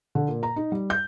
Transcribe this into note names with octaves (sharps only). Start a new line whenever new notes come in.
D3
A#2
A#5
D#4
G3
G6